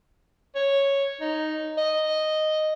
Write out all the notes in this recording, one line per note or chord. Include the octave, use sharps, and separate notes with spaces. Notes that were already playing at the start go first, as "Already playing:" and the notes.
C#5
D#4
D#5